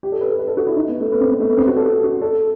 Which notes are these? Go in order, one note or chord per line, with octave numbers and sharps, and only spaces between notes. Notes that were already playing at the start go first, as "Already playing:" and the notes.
G4
A4
B4
A4
B4
A4
F#4
E4
D#4
B3
A3
B3
C4
B3
A3
B3
C4
F#4
A4
F#4
F#4
A4